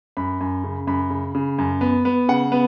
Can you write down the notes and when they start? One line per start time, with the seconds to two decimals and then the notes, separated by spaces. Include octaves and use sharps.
0.17 F#2 B5
0.41 F#2
0.64 C#3
0.87 F#2 B5
1.10 C#3
1.35 C#3
1.58 F#2
1.81 B3
2.05 B3
2.28 C#3 F#5
2.52 B3